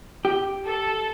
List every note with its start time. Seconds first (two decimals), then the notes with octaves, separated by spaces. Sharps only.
0.25 G4
0.66 A4